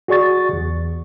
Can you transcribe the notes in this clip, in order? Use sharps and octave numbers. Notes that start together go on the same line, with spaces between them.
F#4 G#4 D5 C#6 A6
E2